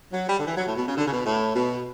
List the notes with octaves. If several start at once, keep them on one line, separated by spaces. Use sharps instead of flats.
F#3
G3
D3
E3
F#3
A2
B2
C#3
D3
C#3
B2
A2
B2